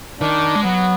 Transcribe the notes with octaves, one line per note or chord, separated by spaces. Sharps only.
D#3 D4
G#3
F#3 B3